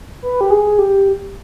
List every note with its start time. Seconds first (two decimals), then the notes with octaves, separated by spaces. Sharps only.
0.22 B4
0.41 G4
0.50 G#4
0.78 G4